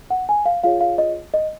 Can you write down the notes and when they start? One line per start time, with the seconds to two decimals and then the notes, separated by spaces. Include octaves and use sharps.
0.10 F#5
0.29 G#5
0.46 F5
0.64 F4 G#4 C#5 F5
0.81 F5
0.98 D#5
1.34 D#5